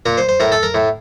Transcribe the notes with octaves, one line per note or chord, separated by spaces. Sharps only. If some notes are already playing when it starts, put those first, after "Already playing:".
A#2 A#4
C5
C5
A2 A#4
A4
A#4
A2